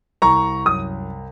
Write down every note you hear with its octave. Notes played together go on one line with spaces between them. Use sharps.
C2 A#5 C#6
F#2 D#6